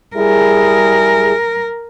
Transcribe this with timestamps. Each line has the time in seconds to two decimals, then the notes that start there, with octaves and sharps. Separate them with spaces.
0.16 G3 E4 G#4 A#4